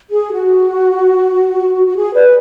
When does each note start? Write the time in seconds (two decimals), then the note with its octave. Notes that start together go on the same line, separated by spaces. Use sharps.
0.09 G#4
0.32 F#4
1.87 F#4
1.96 G#4
2.14 B4 D5